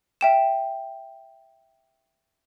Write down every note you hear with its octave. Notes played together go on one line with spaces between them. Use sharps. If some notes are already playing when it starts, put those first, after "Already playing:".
E5 G5 E7